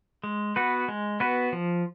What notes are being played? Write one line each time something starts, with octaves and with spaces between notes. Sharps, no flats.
G#3
B3 F#4 B4
G#3
B3 F#4 B4
F3